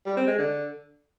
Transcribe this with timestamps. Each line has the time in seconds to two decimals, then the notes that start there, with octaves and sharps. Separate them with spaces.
0.06 G3
0.17 C4
0.27 G#3
0.38 D3